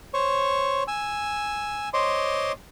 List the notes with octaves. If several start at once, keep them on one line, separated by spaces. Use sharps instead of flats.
C5 C#5 C#6
G#5 E6
C5 C#5 D#5 C6 D6